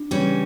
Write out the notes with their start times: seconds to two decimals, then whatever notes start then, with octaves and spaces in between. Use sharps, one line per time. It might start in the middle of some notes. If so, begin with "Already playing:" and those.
Already playing: D4
0.11 C#3 E3 G3 C#4